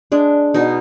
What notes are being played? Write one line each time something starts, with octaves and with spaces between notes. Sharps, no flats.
G#3 D4
B2 D#4